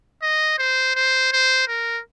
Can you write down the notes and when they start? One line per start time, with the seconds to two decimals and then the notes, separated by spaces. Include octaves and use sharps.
0.22 D#5
0.58 C5
0.96 C5
1.32 C5
1.68 A#4